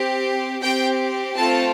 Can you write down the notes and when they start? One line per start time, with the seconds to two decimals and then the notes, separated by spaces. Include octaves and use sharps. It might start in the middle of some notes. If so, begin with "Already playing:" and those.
Already playing: C4 G4
0.62 C4 G4 G5
1.37 A3 C4 F4 A4 A5